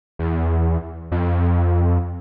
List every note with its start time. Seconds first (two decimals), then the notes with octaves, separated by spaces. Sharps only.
0.19 E2
1.12 F2